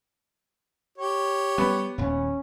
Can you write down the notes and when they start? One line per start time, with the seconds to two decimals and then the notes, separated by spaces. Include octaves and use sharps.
0.98 G4 C#5
1.58 G3 B3
1.98 D#1 D#2 C#4